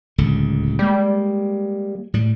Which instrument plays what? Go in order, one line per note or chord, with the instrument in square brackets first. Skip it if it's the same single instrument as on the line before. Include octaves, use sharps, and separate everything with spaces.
[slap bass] D1 C#2 D3
[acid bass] G3 [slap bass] G#3 A#3
[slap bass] A2 G3